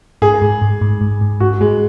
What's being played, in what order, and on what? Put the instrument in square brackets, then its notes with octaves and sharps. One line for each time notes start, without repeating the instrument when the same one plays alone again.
[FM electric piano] G#2 [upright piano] G#4
[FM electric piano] G#2
G#2
G#2
G#2
G#2
[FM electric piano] G#2 [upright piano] F#4
[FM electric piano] G#2 [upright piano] G#3